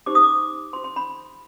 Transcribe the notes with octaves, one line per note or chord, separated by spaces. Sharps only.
D#4 G4 C5 D6
D#6
D6
F4 C5 C6
C6
B5